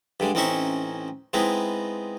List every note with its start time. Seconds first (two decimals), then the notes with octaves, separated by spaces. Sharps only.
0.20 G2 D3 G#3
0.35 A1 C4 C#4 D#4 E5 C#6
1.33 G#3 B3 C4 D#4 E4